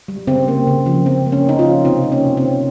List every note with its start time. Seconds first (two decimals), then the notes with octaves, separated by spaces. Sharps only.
0.08 G3
0.27 C#3 C4
0.48 A#3
0.67 C#3
0.86 F3
1.06 C#3 C4
1.26 A#3
1.32 C#4
1.46 C#3 D#4
1.59 F4
1.65 F3
1.85 C3 C4
2.04 A#3
2.12 C#4
2.25 C3
2.37 C4
2.44 D#3